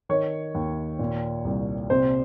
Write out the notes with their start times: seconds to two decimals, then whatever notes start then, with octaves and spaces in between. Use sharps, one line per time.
0.09 D#3 C#5
0.55 D#2
0.99 A#2
1.45 C2
1.90 C3 C5